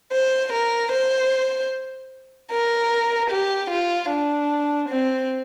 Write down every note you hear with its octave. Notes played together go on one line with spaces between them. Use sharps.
C5
A#4
C5
A#4
G4
F4
D4
C4